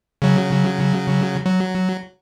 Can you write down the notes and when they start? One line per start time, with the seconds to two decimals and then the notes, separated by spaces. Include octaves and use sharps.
0.22 C#3 F#3
1.46 F#3